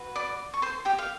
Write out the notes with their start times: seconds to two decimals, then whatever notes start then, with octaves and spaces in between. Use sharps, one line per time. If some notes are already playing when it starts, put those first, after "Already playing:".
Already playing: F#4 B4
0.16 D5 D6
0.54 C#6
0.62 C5 C6
0.85 G4 G5
0.98 F5